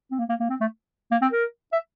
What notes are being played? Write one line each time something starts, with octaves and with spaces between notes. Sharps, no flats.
C4
A#3
A#3
A#3
C4
A3
A#3
C4
A#4
E5